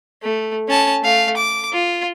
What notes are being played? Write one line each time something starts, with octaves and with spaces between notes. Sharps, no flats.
A3
C#4 A5
A3 F5
D6
F4